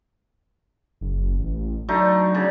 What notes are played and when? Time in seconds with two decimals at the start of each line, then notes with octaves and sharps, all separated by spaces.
1.01 F#1
1.39 A1
1.89 D3 F#3 A3 D#4
2.34 C#3 D5